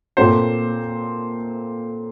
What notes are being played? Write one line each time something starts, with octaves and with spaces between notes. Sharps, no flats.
A#2 A3 C4 C5